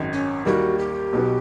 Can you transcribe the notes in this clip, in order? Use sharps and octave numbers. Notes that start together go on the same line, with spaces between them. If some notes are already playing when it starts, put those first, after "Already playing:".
Already playing: G#1 F#2 D#3
C#4
D#2 D#3 G3 A#3 F#4
G4
B1 B2 F#3 B3